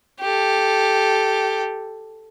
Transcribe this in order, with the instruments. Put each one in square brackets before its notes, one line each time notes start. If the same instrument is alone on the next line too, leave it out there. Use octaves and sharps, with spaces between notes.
[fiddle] G4 A4